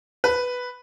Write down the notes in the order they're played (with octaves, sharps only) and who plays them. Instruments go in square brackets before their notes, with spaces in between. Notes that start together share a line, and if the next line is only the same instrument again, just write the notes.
[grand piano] B4